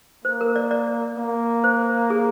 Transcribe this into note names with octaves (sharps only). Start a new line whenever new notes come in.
A#3 C5
A#4
D5
D5
A#3
C5
G#4